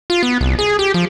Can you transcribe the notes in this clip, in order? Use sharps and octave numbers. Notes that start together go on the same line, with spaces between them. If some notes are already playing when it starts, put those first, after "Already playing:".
F4
B3
C2
G#4
G4
F3